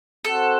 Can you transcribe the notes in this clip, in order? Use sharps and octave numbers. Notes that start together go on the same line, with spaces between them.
C4 F#4 A4 C5 F#5